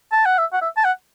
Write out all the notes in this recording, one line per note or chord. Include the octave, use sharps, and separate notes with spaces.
A5
F#5
E5
F#5
E5
A5
F#5